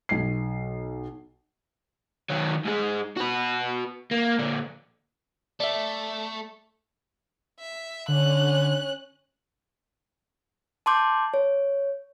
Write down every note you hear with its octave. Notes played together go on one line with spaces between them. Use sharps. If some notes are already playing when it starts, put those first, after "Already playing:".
B1 C7
D#3 F#3
G#2 G#3
F#4 B4
A#3
A#2 D3
A3 D5 E5
E5
D3 C#4 F#6
A5 C6 D6 G6
C#5